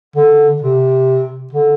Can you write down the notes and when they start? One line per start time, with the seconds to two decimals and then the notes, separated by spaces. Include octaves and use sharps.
0.16 D3
0.62 C3
1.53 D3